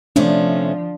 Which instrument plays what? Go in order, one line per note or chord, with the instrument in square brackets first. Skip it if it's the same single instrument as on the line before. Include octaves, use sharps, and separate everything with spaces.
[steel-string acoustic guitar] C3 A3 C#4 [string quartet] F3 [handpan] D4